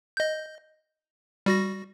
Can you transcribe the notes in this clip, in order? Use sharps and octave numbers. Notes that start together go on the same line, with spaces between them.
D#5 G6
G3 F#4 A#6